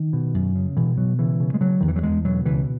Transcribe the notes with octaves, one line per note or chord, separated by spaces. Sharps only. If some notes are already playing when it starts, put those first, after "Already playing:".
Already playing: D#3
B2
F#2
C#3
B2 E3
B2 F#3
C#3 E3
C#3
G#3
C#3 F#3
E2 D#3
E3
F#3
E2 G#3
B2 F#3
C#2 E3